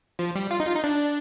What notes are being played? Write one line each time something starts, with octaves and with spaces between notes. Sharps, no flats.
F3
G3
F4
D#4
F4
D#4
D4